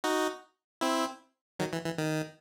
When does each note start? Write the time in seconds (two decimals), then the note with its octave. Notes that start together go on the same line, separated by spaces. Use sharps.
0.04 D#4 F#4
0.81 C4 E4
1.59 D#3 F#3
1.73 E3
1.85 E3
1.98 D#3